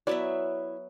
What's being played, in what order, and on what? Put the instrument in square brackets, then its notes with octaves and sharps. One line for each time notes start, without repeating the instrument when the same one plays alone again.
[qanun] F#3 B3 E5 [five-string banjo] E4 D5